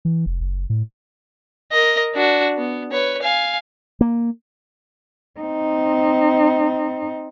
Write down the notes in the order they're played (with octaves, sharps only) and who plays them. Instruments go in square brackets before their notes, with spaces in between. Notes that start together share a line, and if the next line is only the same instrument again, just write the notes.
[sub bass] E3
F1
F#1
A2
[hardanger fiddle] A#4 D#5
D4 F#4
B3
B4 C#5
F5 G#5
[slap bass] A#3
[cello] C4 D#4